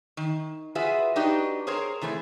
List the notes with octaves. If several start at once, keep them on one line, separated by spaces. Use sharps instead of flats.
D#3
F4 F#4 G#4 B4 E5
D4 D#4 F#4 G4 B4 D#5
G#4 A#4 C5 C#5 A#5
C3 E3 A3 G#4